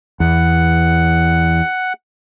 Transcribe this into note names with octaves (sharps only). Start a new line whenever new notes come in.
E2 F#5